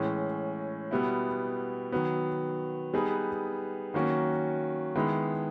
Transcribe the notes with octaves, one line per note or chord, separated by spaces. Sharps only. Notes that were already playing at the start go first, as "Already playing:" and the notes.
Already playing: A2 E3 G#3 C#4
B2 G3 B3 E4
D#3 F#3 B3
G3 B3 D#4 G#4 B4
D#3 F#3 A#3 C#4 F#4
D#3 G#3 B3 E4